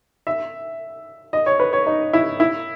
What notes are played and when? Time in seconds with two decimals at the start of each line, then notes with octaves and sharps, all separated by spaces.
0.27 E5
1.33 D#5
1.46 C#5
1.60 B4
1.73 C#5
1.87 D#4
2.13 E4
2.40 E4